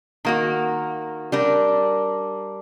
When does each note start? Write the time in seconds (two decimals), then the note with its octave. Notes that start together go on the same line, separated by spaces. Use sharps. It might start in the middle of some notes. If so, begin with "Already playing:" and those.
0.25 D#3 A#3 F#4
1.32 G3 D4 A#4